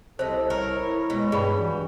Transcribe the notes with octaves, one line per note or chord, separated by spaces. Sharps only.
C2 C3 A4 C5 D#5
A#4 C#5
E4
B2 G#3
G2 G3 D4 G#4 B5
E3 F#4